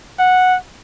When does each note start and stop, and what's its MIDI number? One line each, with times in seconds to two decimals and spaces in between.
0.19 0.57 78